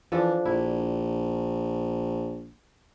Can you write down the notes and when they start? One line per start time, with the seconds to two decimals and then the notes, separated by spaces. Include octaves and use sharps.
0.12 E3 F3 D4 A4
0.45 A#1 E4